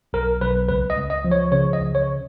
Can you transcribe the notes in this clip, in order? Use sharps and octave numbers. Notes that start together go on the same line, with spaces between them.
B1 A#4
B1 B4
C#2 B4
D#5
C#2
D#5
F3
C#5
C#3 C#5
D#5
C#2
C#5